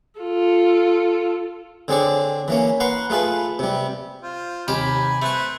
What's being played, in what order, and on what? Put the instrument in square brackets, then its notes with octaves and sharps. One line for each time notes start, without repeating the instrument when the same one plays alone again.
[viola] F4 A4
[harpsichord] D3 C4 G#4 C#5 D5
E3 A#3 C#4
B4 F#5 A#5 C6 C#6
A3 F4 G#4 B4 A5
C3 G3
[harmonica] F4 C5
[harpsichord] D#2 G4 C5 [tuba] C3 [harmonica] G#5 [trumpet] B5
[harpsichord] A3 C#6 [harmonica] B4 C5